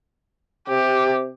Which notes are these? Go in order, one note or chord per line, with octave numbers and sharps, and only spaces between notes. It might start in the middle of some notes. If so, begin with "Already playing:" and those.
C3 G4